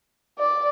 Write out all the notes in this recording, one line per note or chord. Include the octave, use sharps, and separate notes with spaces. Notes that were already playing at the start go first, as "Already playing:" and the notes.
D5